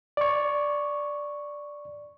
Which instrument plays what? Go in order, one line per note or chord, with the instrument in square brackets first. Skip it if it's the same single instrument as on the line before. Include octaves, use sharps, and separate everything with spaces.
[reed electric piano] D5 C#6